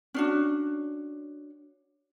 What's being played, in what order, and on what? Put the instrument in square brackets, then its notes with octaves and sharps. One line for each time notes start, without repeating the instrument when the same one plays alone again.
[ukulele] C#4 D4 F#4